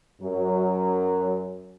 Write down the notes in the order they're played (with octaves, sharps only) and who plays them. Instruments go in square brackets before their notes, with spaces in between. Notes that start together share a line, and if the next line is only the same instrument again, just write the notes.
[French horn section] F#2 F#3